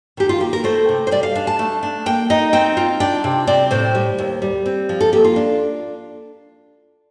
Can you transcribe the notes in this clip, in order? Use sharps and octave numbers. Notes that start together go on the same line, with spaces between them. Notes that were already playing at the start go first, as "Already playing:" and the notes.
D#3 G4
F4
A#3 G4
A#4
A3 C5
C3
C5
G3 D5
F5
D4 F5
A5
A3
D4
A#3 G5
D#4 D#5
C4 G5
F4
D4 G5
C3
C4 D5
A2 C5
G3
D#2
G3
C4
F3
A4
A#3 G4
F4
D4